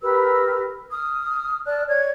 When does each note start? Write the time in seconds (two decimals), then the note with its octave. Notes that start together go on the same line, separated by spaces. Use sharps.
0.01 G4 A#4 B4 E6
0.91 D#6 F6
1.66 D5 A5 F6 F#6
1.86 C#5 D5 G#6